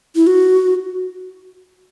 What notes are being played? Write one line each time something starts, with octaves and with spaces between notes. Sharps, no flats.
E4
F#4